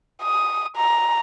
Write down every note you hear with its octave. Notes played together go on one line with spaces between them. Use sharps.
D#6
A#5